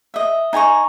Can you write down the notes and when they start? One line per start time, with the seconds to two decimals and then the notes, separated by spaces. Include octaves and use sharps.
0.14 D#5 E5
0.53 D#4 G#5 A#5 C#6